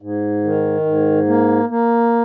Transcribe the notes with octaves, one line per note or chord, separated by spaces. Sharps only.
G#2
D#3
G#2
A#3
A#3